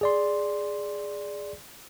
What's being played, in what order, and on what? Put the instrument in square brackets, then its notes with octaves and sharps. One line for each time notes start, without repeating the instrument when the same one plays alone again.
[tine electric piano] G#4 D5 C6